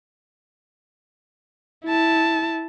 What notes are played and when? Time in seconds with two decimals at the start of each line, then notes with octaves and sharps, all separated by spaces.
1.85 E4 A5